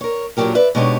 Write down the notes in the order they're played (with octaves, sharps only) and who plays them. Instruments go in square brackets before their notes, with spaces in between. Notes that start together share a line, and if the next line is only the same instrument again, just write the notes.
[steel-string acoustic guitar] A#4 C#5
G2 A#2 F3 F#3 G4 A#4
B4 D5 E5
B2 G#3 D4 D#4 G4 C#5